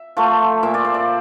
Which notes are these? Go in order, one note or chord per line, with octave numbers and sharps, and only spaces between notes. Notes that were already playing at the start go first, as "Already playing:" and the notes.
Already playing: E5
F3 A3
A#2 E5
D5
C5
D5